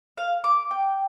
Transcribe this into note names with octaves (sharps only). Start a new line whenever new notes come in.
F5
D6
G5